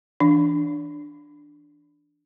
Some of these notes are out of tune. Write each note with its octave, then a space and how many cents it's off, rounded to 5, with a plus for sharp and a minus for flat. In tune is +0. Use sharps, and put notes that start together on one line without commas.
E3 +0 D4 +0